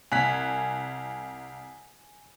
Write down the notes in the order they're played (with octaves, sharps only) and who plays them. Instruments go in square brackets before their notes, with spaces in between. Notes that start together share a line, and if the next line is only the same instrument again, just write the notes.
[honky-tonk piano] C2 [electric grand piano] G#5 F#6 B6